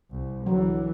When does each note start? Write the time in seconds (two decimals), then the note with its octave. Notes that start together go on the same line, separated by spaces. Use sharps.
0.11 C2
0.46 D3 E3 F#3